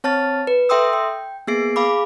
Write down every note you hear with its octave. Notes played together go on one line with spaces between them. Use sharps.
C4 C#5 A5 F6 A6
B4
A4 E5 G5 C6 D#6 E6
G5
A#3 B3 G#4 C7 D7
G#4 F5 B5 D6